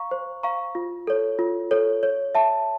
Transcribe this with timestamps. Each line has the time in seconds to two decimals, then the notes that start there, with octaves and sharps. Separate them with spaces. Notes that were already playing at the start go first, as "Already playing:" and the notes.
Already playing: F5 A#5 C#6
0.11 C5
0.43 F5 A#5 C#6
0.75 F4
1.07 A4 C#5
1.39 F4
1.71 A4 C#5
2.03 C#5
2.35 E5 A5